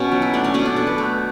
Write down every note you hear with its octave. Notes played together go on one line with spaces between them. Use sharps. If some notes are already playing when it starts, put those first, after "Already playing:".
Already playing: B2 C#4
F#3
E4
A3 D4
C#4
B2 D4
D4
B2 A4
B4
A3